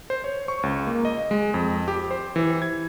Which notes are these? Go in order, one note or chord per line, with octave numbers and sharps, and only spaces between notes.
C5
C#5
C#6
C#2
A#3
D#5
G#3
F2
G4
C5
E3
G#6